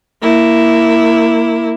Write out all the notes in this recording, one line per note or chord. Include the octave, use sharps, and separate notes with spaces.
A#3 E4